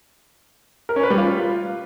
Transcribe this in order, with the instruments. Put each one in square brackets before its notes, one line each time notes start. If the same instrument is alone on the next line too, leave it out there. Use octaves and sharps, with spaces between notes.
[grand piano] A#4
C#4
B4
G3
F4